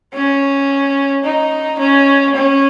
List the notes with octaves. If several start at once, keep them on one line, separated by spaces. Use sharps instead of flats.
C#4
D#4
C#4
C#4